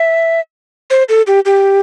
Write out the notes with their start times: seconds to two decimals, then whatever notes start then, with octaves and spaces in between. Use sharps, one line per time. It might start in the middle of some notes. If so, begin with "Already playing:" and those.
Already playing: E5
0.90 C5
1.09 A4
1.27 G4
1.45 G4